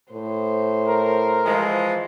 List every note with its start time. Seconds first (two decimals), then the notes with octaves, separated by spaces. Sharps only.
0.12 A2 C5
0.87 A#4
1.45 E3 F3 G#3